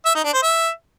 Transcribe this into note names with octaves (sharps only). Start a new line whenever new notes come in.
E5
D#4
D4
C5
E5